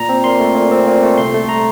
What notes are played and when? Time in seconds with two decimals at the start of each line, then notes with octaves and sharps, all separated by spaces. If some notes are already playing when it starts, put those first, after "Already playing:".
Already playing: A#2 A#5
0.09 C4
0.24 A#2 C6
0.40 A3
0.55 A#2
0.71 C4
0.87 A#2
1.03 A3
1.18 C2 C6
1.34 A3
1.49 A#5